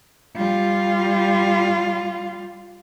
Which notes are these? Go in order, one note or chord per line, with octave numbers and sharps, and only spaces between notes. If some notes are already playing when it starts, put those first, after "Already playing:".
G3 F4